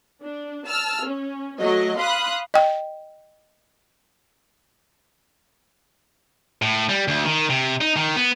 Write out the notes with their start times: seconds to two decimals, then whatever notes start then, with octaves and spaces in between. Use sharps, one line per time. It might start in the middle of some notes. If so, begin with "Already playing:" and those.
0.22 D4
0.66 A5 E6 F6
1.05 C#4
1.60 F#3 A3 D#5
1.99 F5 B5 C6 D#6 F#6
2.54 D#5 G5
6.62 A2
6.89 G3
7.08 D2
7.25 D#3
7.50 C3
7.81 D#4
7.97 D#3
8.16 B3